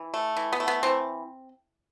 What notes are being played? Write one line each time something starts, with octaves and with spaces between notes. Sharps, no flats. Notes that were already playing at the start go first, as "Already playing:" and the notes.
Already playing: E3
A3
E3
B3
A3
B3
E3 C4